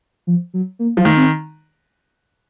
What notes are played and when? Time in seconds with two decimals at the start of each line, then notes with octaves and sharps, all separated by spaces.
0.27 F3
0.54 F#3
0.79 A#3
0.97 F3 F#3
1.05 D#3 A3
1.16 C4